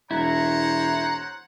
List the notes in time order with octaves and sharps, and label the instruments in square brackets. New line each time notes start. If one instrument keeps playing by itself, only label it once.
[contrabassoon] E1 [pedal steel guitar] E4 [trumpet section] C5 C#5 F#5 [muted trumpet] A#5